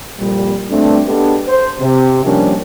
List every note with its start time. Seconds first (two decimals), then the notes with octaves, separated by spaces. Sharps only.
0.18 C2 F2 A#2 G3
0.70 G2 B2 A3 C4 D4
1.07 G#3 B3 D4 G4 A4
1.48 C5
1.81 C3
2.24 D#3 F3 G3 A#3 C#4 D4